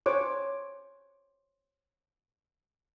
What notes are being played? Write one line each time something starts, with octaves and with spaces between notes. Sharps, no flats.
C5 C#5 D6